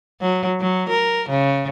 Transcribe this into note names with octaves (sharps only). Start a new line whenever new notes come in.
F#3
F#3
A#4
C#3